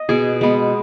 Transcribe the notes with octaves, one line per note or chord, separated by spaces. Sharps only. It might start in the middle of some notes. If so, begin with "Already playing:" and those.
Already playing: D#5
B2 G#4
G#3 B3